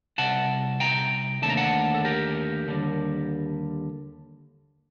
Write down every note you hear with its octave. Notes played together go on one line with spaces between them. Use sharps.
C2 C3 F#5 A5
G5 A#5
D#2 D3 A3 A5
A#5
F#5 A5
A4
G4 A#4
D#2 D3 G3